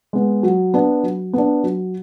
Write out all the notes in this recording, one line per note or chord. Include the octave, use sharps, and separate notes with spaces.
G#3 B3
F#3
B3 D4
F#3
B3 D4
F#3